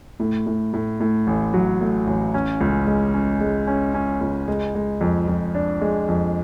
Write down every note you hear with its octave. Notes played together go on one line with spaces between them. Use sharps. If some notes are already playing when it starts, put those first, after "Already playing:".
A2
A2
A2
A2
A1
F#3
A2
A1
C#4
C#2
G#3
C#4
G#3
C#4
C#4
C#2
G#3
G#3
F2
F2
D4
G#3
F2